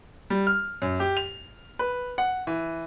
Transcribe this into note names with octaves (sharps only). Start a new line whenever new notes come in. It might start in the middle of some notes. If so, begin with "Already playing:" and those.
G3
F6
F#2
G4
F7
B4
F#5
E3